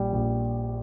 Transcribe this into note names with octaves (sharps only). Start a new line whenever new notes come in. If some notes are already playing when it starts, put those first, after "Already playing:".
Already playing: A#1 G3
A#1